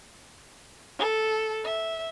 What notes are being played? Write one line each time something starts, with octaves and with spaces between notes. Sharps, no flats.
A4
E5